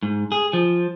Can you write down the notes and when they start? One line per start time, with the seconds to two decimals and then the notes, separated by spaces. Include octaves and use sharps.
0.03 G#2
0.32 G#4
0.53 F3